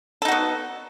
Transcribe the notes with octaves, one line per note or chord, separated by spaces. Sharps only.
B3 D#4 F#4 A4